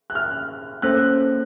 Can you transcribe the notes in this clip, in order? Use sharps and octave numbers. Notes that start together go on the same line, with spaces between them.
F#6
F6
A#3 C#4 A4 C5 F#6